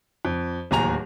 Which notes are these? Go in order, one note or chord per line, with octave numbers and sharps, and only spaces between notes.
F2
D1 D#2 G#5 A#5 F7